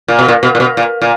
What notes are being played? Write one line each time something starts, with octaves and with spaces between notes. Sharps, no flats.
A#2
B2
A#2
B2
A#2
B2
A#2
A#2